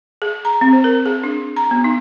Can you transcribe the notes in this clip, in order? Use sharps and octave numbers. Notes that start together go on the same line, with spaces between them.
G#4
A#5
C4
C5
A#4
G#4
D4
A#5
B3
D#4